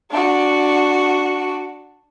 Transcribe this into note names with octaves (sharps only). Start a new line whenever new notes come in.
D4 F#4